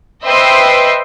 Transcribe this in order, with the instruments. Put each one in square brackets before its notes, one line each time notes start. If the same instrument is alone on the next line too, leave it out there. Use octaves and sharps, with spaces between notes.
[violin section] B4 C5 D#5 E5 G5 C6